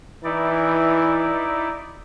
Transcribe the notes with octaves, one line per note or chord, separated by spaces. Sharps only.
E3 D#4 E4 D5